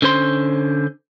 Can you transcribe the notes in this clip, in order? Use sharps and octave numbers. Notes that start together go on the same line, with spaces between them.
D3 C#4 C5 C6